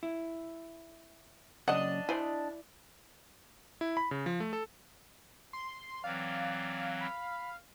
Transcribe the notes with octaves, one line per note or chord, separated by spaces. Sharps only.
E4
F#2 C#3 D4 D5 D#5 F#5
E4 C5 D5 G#5
E4
B5
C#3
F3
A3
A4
C6
E3 F#3 C4 D5 F5
B5